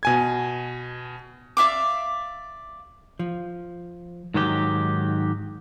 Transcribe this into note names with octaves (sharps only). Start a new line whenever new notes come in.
B2 G#5 G#6
D5 E5 F5 D6
F3
G#2 D#3 F#3 G4